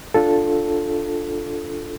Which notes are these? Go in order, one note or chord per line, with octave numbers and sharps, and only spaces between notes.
D4 F4 A4